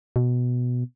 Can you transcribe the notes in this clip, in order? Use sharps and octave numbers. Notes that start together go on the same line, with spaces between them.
B2